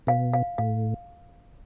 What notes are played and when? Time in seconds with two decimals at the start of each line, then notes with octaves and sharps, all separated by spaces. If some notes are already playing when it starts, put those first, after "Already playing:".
0.07 B2 F5
0.34 F5
0.58 A2 F5